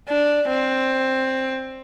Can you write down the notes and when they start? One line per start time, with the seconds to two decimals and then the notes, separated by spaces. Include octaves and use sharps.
0.09 D4
0.48 C4